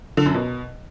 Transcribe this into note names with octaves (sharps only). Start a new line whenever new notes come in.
D3
F#2
B2